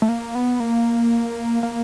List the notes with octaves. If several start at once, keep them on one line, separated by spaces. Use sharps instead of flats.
A3
A#3
B3
A#3
A#3